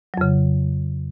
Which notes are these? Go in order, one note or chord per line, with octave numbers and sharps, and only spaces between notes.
F2 C#3 F#3